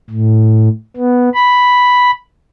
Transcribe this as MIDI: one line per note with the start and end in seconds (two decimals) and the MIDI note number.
0.10 0.69 45
0.96 1.29 59
1.35 2.11 83